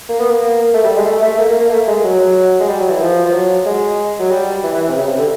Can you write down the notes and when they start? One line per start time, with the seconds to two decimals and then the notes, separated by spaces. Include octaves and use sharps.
0.09 A#3
0.20 B3
0.31 A#3
0.74 A3
0.84 G3
0.96 G#3
1.06 A3
1.23 A3
1.38 A#3
1.49 A#3
1.60 A#3
1.71 A3
1.88 G#3
2.04 F#3
2.20 F#3
2.60 G#3
2.68 G3
2.80 F#3
2.90 E3
3.01 F3
3.25 F3
3.34 F#3
3.66 G#3
4.19 F#3
4.31 G3
4.64 E3
4.74 E3
4.88 C3
4.96 C#3
5.07 C3
5.17 D3